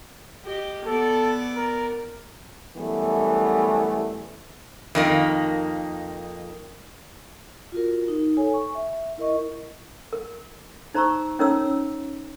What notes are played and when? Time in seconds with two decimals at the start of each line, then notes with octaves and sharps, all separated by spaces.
0.45 G4 D#5
0.86 B3 A4 D5
1.56 A#4
2.76 F#2 E3 G3 A3 B3
4.95 F2 D#3 A#3
7.72 F4 F#4 A#4
8.08 D#4
8.37 A4 C#5 G#5
8.54 C#6
8.75 E5
9.18 E4 A#4 D#5 C#6
10.13 A#4
10.94 D#4 C5 A#5 C6 C#6 E6
11.39 C#4 D#4 A#4 C#5 A#5 E6